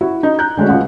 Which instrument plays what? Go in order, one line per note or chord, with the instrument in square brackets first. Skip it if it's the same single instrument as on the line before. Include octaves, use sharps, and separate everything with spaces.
[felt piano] E4 F#4
D#4
A#5 F#6 G6
D3 G#3 A3 C#4 F#4
D#1 C#2 F#5